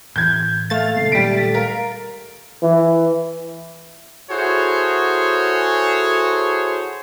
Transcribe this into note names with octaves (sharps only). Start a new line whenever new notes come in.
A2 E3 G6 G#6
A3 F5 A6
C#3 G#3 A#3 C7
A#2 D#3 G3 G#3 B6 D7
A#4 F5
E3
E4 F#4 G#4 A4 C5 C#5